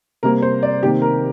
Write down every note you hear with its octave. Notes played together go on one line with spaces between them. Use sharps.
C3 G3 A#3 A#4
C5
D5
C3 D#3 A#3 G4
A#4